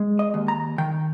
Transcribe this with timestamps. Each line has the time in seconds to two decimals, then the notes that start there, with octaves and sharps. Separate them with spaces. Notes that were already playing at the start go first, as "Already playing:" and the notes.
Already playing: G#3
0.19 D#5
0.34 D#2
0.48 A#5
0.78 D#3 G5